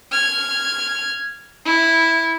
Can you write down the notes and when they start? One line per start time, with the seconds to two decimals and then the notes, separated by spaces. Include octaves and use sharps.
0.12 F6 G#6
1.66 E4